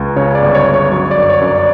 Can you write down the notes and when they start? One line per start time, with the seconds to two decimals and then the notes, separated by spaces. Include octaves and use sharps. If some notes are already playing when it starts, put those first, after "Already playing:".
Already playing: C#2
0.16 C#3 C#5
0.35 D5
0.42 G1
0.55 C#5
0.67 G1
0.74 C#5
0.92 F#3 C#5
1.11 D5
1.17 F#2
1.30 C#5
1.41 F#2
1.48 D5
1.58 D5